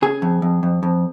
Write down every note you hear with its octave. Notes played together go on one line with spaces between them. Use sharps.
C#3 G#4
F2
F2
F2
F2